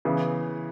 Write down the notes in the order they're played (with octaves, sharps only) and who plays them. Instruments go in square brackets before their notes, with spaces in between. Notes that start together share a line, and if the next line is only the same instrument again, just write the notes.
[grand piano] C#3 E3 B3 E4